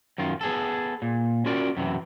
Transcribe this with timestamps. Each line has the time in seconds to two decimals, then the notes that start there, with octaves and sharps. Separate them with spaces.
0.18 F#2 D#3 F4
0.41 B3 G#4 A4
1.02 A#2
1.46 C#4 F4 F#4 A#4 D5
1.77 F#2 C3 E3